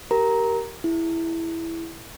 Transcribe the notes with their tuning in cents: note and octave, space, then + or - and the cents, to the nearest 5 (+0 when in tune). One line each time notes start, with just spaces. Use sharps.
G4 -20 A#4 +0 A#5 +0
E4 +0 G#4 +0